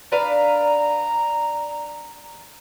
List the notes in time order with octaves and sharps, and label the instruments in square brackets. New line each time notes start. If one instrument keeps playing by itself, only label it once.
[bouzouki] D4 B4 F5 [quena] A#5